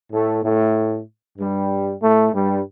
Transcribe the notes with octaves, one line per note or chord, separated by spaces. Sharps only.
A2 A3
A2 A3
G2 G3
A2 A3
G2 G3